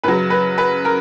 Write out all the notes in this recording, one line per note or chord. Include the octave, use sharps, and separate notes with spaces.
F#2 C#3 F#3 B4
B4
B4
A#4